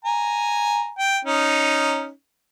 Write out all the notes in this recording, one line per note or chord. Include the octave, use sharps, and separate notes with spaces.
G#5 A#5
G5
C#4 D#4